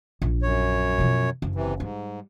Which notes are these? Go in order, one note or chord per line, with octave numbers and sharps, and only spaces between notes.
A#1
F#2 C#5
B2 F3
F#1
C3 E3
G#2 G3